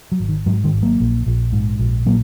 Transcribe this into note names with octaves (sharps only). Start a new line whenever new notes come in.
F#3
G#1
D#3
G#2 F#3
D#3 G#3
G#1
F#3 A#3
A#1
A#1
G#2
A#1
A#2 F#3 A#3